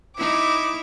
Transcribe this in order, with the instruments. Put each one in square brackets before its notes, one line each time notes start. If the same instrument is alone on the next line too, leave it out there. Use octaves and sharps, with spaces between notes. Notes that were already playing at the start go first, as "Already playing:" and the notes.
[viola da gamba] D#4 E4 [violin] D6